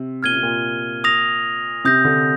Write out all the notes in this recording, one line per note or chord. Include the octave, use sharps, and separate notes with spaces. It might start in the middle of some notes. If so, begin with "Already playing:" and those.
Already playing: C3
A#2 F6 G#6 D#7 G7
C3
A#2
D#6 A#6 F7
C3 D#6 G6 A#6
D3